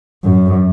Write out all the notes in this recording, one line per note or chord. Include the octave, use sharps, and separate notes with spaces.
F#2